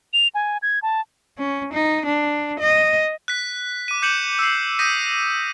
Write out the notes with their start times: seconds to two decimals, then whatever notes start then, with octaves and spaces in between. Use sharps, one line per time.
0.13 F7
0.35 G#5
0.62 G#6
0.82 A5
1.38 C#4
1.73 D#4
2.05 D4
2.60 D#5
3.28 F#6 B6
3.88 D6 D#7
4.02 D6 G6 C#7 D#7 E7 F#7
4.39 E6 C7
4.79 D#6 E6 G6 A#6 B6 D#7